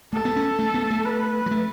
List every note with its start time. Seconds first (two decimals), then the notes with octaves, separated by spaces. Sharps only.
0.13 A3 A4
0.25 B3
0.36 C#4
0.59 A3
0.74 B3
0.90 A3
1.05 B4
1.46 F#3
1.51 A3